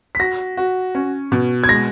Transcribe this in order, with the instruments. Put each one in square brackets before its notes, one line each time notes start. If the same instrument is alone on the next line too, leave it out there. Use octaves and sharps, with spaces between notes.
[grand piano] B6
[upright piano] F#4 [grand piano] A#6
[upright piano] F#4
C#4
B2
[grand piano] G#6
[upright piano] G#3 [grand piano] A#6